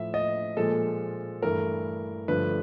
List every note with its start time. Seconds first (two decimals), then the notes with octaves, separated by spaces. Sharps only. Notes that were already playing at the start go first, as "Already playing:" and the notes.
Already playing: A2 F3 A3 E5
0.14 D#5
0.57 A#2 F3 G#3 A4
1.42 G2 E3 A3 A#4
2.28 G2 D3 F3 A3 B4